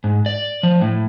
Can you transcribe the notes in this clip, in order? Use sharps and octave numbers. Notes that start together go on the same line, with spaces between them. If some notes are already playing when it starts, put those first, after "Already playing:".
G#2
D5
F3
A2